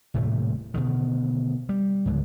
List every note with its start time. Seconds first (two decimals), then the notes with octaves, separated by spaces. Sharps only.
0.14 D#1 A2 C3 A3
0.74 B2 D3 D#3
1.69 G3
2.06 C#2 G#2 D3